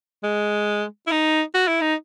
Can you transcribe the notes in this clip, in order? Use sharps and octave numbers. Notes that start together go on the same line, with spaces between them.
G#3
E4
D#4
F#4
E4
D#4